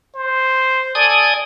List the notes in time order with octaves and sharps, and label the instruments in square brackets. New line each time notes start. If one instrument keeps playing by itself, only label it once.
[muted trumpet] C5
[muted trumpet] A4 [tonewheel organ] D5 G#5 D#6